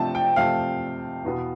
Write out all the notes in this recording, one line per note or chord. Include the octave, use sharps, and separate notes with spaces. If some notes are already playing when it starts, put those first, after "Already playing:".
Already playing: C3 F3 A3 C4 A5
G5
C3 F3 A3 C4 F5
E2 B2 B3